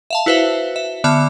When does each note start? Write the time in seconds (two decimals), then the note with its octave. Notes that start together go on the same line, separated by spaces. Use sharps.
0.10 E5 F5 A5
0.26 E4 F#4 B4 C5 E5 F5
0.76 E5
1.04 D3 B3 E5 D6 F6